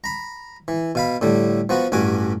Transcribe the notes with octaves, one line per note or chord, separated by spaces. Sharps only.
A#5 B5
E3
B2 F5 B5
A2 D3 G3
F3 B3 F#4
A1 G2 F#4 G#5 D6